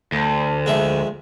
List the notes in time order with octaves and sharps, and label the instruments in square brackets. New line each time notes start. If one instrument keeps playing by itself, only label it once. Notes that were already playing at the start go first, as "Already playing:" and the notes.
[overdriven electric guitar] D2
[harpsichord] A#1 G#3 E5